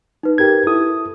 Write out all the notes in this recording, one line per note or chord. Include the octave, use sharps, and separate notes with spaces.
D#4 B4
G4 A#4 G#6
E4 A4 D#6